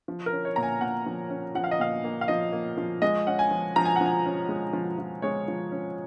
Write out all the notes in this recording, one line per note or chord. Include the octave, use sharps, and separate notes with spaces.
F3
A#4
C#4
C#5
A#2 A#5
G#5
A#2 F#5
F3
C#4
F3 F#5
F5
D#5
A#2 F5
A#3
F5
F3 D#5
A#3
F3
G#3 D#5
C#4 F#5
G#5
F3
F3 A#5
G#5
F#5
F3 G#5
C#4
G#3
F3
F3
G#3 C#5
F3
C#4